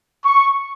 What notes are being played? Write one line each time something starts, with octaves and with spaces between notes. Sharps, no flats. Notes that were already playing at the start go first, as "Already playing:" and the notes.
C#6